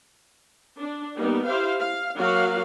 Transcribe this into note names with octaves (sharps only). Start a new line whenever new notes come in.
D4
G3 A#3 B3 D#4
E4 G4 C5 F5
F5
F#3 A#3 F#4 F5